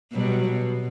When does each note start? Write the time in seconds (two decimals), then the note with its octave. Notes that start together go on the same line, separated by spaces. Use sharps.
0.12 B2 F#3 G3
0.48 B2